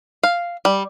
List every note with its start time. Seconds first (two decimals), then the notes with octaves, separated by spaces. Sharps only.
0.23 F5
0.65 G3